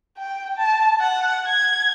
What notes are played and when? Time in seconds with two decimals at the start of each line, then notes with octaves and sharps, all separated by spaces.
0.18 G5
0.57 A5
1.00 F#5
1.46 G#6